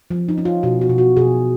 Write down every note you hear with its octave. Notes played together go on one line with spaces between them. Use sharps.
F3
D#4
C#4
F4
B2 F#4
F#4
B2
F#4
B2 G#4